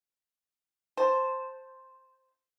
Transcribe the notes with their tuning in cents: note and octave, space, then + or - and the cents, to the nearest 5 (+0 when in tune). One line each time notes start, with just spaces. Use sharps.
C5 +0 A5 +0